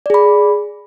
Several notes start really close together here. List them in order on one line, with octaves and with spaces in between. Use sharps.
D5 G#4 B5